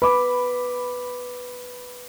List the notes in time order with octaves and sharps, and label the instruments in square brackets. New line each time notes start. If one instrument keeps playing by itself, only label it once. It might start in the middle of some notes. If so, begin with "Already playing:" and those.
[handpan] B4 [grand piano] B5 D6